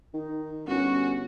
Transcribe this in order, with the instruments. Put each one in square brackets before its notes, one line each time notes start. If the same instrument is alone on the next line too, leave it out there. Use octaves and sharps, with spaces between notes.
[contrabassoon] D#3 [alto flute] D#4
[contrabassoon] G1 [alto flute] C#4 [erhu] F#4